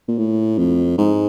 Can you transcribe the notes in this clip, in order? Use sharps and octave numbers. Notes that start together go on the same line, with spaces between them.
A#2
A2
F2
G#2